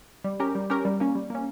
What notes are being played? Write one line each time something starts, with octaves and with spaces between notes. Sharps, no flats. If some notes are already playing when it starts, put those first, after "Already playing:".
G3
C#4 G4 A#4
G3
C#4 G4 A#4
G3
A#3 C#4
G3
A#3 C#4